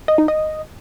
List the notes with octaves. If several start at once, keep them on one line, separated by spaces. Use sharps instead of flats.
D#5
D#4
D#5